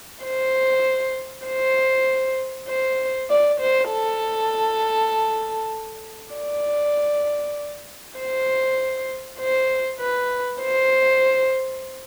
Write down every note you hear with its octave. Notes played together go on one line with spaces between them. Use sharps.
C5
C5
C5
D5
C5
A4
D5
C5
C5
B4
C5